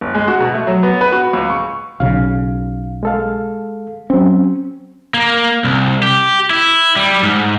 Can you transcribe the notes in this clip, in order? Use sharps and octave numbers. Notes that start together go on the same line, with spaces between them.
G1
G#3
F#4
B2
A3
F#3
B3
B4
F#4
C#2
C#6
B1 C#3 F5
G#3 A4 F5
F#3 C4 C#4
A#3
C2
G4
E4
G3
G#2